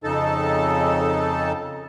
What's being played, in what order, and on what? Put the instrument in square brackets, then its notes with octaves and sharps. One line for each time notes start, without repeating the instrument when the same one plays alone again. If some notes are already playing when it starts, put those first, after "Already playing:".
[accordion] F2 C#3 D#4 A4 A5